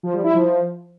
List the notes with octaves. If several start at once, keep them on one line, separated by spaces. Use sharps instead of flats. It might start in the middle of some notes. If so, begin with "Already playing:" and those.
F3
G3
E4
F3